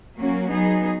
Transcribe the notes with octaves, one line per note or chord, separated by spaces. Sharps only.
F#3 A#3 C#4 F#4
F#3 B3 D#4 G#4